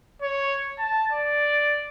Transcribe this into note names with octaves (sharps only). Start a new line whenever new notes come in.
C#5
A5
D5